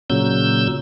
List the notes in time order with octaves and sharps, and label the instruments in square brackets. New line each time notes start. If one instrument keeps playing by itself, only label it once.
[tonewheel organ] A#2 C#3 F#3 E6 G6